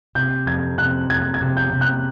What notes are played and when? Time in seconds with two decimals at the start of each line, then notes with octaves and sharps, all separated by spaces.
0.15 C3 G6
0.46 F2 G#6
0.78 C3 F#6
1.10 F2 G#6
1.34 G#6
1.41 C3
1.57 G6
1.73 C3
1.81 F#6